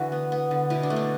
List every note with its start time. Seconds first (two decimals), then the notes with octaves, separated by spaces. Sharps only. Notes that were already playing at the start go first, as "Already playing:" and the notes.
Already playing: D3 E3 F#4 E5
0.12 B3
0.32 B3
0.51 D3
0.70 B2 E4
0.83 D4
0.90 A3
0.96 D4